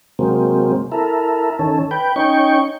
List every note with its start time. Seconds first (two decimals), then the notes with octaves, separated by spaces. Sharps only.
0.19 C3 F#3 G#3 A#3 C4
0.92 E4 A4 A#4
1.59 D#3 C#4 A4
1.91 B4 G5
2.16 C#4 D#4 G5 C#6